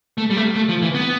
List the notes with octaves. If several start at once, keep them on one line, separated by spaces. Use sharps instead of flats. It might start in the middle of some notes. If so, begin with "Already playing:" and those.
A3
G3
A3
A3
F3
E3
B3